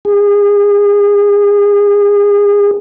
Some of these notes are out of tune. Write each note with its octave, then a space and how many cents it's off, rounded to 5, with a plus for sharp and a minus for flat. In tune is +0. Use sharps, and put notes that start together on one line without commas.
G#4 -30